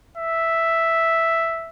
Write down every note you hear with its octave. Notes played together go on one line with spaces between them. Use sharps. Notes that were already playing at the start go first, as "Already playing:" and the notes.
E5